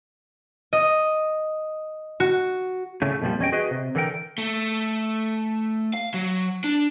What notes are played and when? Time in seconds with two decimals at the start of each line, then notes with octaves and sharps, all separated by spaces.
0.73 D#5
2.20 F#4
3.02 A2 C#3 A3 C#4
3.22 F2 A#2 D3 F3 G3
3.39 E2 C#4 D#5 G5
3.52 F#4 G#4 B4 D#5
3.71 C3
3.95 D3 E3 A4 A#4 G5
4.38 A3
5.94 F5
6.14 F#3
6.64 D4